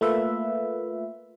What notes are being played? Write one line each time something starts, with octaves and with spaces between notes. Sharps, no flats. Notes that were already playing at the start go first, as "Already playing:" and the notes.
A3 A#3 F4 B4 E5